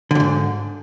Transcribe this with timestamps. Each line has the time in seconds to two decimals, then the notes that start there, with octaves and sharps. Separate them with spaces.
0.11 D3
0.15 F2
0.20 G#2